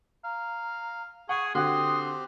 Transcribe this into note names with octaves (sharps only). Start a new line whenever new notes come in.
F5 A#5
G#4 F#5 C#6
D3 C4 F#4 G4 C6 D#6 F#6